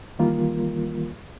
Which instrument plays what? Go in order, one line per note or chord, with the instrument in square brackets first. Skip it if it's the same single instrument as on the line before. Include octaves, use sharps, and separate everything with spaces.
[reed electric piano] D#3 E3 G3 A#3 F4 A#4